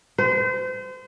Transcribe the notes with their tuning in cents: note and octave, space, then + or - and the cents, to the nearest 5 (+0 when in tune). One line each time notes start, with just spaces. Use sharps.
C5 -35